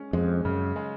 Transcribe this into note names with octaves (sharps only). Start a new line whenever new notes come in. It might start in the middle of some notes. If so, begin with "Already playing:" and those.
Already playing: G#3 C#4
F2 G#3
F#2 C#3
G#3